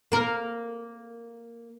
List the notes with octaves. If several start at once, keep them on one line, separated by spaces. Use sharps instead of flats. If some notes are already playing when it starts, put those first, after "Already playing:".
A#3 A#4